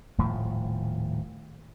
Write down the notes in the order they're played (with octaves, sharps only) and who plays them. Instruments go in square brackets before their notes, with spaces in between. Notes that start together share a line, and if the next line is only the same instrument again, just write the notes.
[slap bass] D#1 A2 D#3 F3